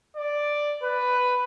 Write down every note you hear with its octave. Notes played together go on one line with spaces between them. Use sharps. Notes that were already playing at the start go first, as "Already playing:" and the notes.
D5
B4